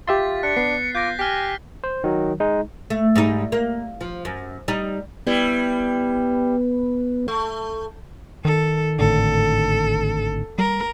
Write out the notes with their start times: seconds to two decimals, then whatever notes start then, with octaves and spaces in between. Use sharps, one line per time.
0.08 F4 G4 E5 C6 A6 B6
0.43 D4 F#6 C#7
0.57 B3 C7
0.95 F4 D6 G6 A#6
1.19 G4 G#5 F6 B6
1.84 C5
2.04 D#3 F#3
2.40 G#3 D#4
2.90 A3
3.15 G#2 G3 D#4
3.52 A#3
4.01 F3
4.25 F#2
4.68 G3 D#4
5.27 G3 B3 E4
7.28 A3
8.45 D#3 A4
8.99 G#1 A2 D3 A4
10.59 G3 A#4